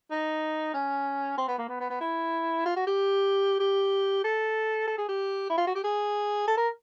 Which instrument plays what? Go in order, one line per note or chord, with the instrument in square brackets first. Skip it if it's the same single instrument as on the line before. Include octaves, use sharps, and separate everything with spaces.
[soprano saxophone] D#4
C#4
C4
B3
A#3
B3
B3
B3
E4
F4
F#4
G4
G4
A4
A4
G#4
G4
E4
F4
F#4
G4
G#4
A4
A#4